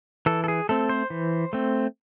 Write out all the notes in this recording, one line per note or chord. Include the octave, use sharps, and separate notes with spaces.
E3 A4
A4
G#4
A3 C4 A4
C5
E3
A3 C4